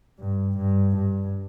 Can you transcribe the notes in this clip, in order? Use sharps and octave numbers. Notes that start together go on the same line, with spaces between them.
G2
G2
G2